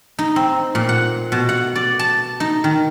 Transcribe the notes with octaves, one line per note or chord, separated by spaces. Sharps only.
D#4
C4
A#2
F#5
B2
F#5
D5
A5
D#4
D#3